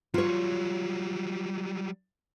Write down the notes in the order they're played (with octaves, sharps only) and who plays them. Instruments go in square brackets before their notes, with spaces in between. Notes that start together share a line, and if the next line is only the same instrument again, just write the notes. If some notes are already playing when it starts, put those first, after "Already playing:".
[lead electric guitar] F#3 G3 [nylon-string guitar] F4 C#5